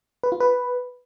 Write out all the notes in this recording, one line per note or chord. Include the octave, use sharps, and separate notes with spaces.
B4
F4
B4